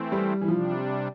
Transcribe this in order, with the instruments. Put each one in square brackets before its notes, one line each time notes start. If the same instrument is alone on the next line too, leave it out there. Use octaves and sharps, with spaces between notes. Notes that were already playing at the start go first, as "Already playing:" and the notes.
Already playing: [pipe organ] E3 A3 C4
[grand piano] G3
E3
[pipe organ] C3 G3 D4 [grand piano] F3